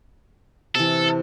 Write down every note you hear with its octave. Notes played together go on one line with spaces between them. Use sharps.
C3 E3 A4